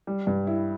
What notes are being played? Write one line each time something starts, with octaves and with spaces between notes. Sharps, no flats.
G3
G2
E4